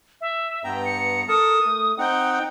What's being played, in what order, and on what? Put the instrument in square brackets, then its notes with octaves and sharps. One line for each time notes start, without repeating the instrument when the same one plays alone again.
[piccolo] E5
[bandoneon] G2 B3 A#5 [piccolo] G5
[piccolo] C#7
[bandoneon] A4 A#4 A5 [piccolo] D#6
[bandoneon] A3
[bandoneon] C4 D#4 F#5 [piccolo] G5